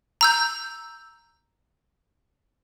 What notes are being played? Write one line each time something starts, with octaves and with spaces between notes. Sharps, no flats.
A#5 E6 G6